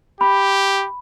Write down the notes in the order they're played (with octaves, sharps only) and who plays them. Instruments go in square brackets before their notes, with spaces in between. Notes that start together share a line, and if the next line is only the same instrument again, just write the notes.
[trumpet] G4 [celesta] B5